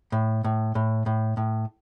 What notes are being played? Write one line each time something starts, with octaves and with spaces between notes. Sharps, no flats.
A2
A2
A2
A2
A2